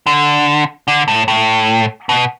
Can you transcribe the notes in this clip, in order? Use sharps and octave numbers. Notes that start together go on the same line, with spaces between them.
D3
D3
A2
A2
B2